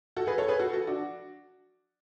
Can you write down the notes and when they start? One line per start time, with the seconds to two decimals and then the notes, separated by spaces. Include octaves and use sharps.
0.16 F#4 A4
0.27 G#4 B4
0.38 A4 C#5
0.48 G#4 B4
0.59 F#4 A4
0.73 F#4 A4
0.87 D4 F#4